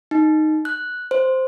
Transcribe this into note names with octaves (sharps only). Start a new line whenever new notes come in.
D#4
F#6
C5